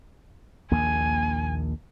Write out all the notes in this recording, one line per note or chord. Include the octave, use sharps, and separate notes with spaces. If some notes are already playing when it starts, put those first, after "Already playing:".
A#1 D#2 A#3 G#5